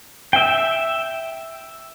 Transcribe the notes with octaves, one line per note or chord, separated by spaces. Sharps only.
E5 G5